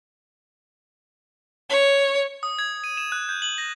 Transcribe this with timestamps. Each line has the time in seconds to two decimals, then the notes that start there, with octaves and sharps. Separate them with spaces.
1.70 C#5
2.43 D#6
2.59 G#6
2.84 D#7
2.97 E7
3.12 F#6
3.29 G6
3.42 F#7
3.58 A#6